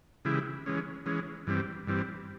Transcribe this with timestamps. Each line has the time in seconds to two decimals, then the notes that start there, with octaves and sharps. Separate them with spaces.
0.25 C#3 E3 G#3 E4 G4
0.66 E3 G#3 C#4
1.06 E3 G#3 C#4
1.47 G2 E3 G3 C4
1.87 G2 E3 G3 C4